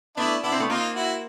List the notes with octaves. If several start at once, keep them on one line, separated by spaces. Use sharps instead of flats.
A3 B3 D4 E4
B3 D4 E4
C4
A3 B3
A#3 C4 D#4 F4
E4 F#4